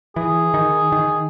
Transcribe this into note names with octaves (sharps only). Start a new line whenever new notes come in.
E3 G#4
D#3
D#3